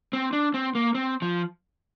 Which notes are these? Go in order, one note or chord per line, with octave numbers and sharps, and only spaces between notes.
C4
D4
C4
A#3
C4
F3